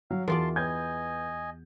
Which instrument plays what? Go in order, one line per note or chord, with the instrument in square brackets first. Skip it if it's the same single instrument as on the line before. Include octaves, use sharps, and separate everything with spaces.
[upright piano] F#3 [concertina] F5
[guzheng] E2 F4 D5 [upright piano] F#4 A#4 [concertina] A5 C6
[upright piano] B3 G6 G#6 [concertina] D#5 G#5